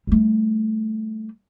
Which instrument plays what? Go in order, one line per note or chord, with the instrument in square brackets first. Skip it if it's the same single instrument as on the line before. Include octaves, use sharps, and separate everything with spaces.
[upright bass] G3 A3